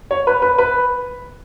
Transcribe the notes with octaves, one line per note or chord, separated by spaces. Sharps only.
C#5
B4
B4
B4